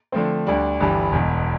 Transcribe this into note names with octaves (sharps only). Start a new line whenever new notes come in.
D3 F3 A3 C4
D2 D3 G3 D4
G1 G2 E3 G3
E1 E2 B2